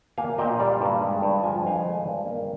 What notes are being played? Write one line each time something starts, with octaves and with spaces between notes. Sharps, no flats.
A#3 F5 G#5
A#2 D#5 G5
G3 D5 F5
G2
G#3
G2
F3 G#5
F2 F5 G#5
G#3
G2
A#3